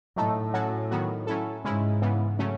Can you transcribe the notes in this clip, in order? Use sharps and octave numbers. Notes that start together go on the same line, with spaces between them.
A2 F#3 A3 D#4 A4
F#3 C#4 F#4 A4
D#3 F#3 B3 F#4
F#3 C#4 E4 A4
G#2 C#3 G#3 C#4 E4
C#3 E3 B3
C#3 F#3 A3 C#4